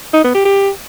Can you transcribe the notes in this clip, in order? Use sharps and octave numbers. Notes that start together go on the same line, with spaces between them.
D#4
B3
G4
G4